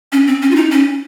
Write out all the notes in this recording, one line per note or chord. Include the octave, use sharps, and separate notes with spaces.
C#4
C4
C#4
F4
D#4
C#4